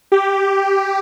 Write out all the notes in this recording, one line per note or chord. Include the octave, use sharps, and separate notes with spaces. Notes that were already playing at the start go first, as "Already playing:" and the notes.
G4